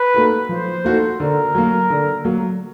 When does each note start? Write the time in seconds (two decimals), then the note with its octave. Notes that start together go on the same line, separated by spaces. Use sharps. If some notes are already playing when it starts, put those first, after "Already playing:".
Already playing: B4
0.14 A#3 D#4 F#4 A4
0.49 F3 C5
0.84 A#3 D#4 F#4 A4
1.19 D3 A#4
1.55 F#3 A#3
1.90 D3
2.25 F#3 A#3